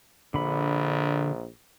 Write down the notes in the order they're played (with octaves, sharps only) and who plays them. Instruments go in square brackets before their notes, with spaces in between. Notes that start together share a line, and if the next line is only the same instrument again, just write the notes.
[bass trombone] A#1 [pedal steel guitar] D3 B5